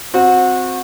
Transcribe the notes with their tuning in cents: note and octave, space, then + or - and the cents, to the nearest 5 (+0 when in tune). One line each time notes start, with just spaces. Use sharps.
C4 +0 F#4 -25